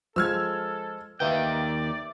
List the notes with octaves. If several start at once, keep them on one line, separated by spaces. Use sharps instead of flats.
F3 G#3 A4 E6 F6 G#6
D#2 D#3 B4 D5 E5 F5 G5